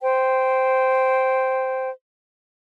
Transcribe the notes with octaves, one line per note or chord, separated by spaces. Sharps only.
C5 G5